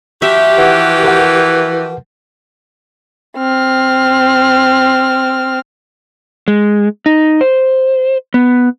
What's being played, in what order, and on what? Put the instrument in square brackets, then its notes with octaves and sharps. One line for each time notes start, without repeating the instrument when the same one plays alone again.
[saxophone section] F3 F#4 G4 [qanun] E5
[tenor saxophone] E3 [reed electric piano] B4 F#5
[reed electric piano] A#4 B4 F#5
[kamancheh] C4 F6
[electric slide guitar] G#3
D#4
C5
B3